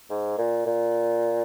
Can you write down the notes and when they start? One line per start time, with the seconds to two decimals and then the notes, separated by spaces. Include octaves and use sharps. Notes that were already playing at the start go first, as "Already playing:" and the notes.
0.10 G#2
0.38 A#2
0.66 A#2